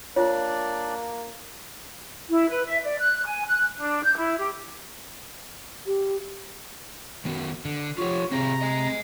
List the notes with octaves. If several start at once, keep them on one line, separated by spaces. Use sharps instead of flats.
A#3 D4 F4 C#5 D5
E4
B4
E5
D5
F#6
G#5
F#6
D4
G6
E4
G4
G4
D#3 B3 F#4
D3
F3 F4 G4 C#5
C3 C4 G#4 A#5
D#5 G#5